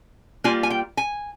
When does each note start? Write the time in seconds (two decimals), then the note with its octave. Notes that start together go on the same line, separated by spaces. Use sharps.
0.44 G3 A#3 F4 G#5
0.63 G#5
0.70 G5
0.97 G#5